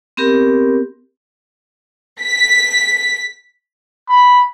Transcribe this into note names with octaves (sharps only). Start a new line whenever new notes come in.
B3 C4 G4 A#4
B6
B5